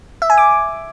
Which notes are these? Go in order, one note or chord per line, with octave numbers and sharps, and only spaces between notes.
E5
G#5
D6